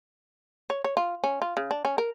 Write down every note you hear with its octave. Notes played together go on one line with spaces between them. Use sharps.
C#5
C#5
F4
C#4
F4
C#3
D4
C#4
A#4